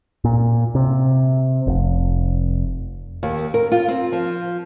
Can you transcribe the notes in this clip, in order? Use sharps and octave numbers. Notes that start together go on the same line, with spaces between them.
A#2
C3
F1
D#2
A#4
F4
C4
F3